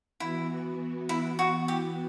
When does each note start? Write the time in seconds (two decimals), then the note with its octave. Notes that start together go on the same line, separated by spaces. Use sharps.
0.20 E3 B3 E4 F#4
1.09 E4
1.39 F#4
1.68 G4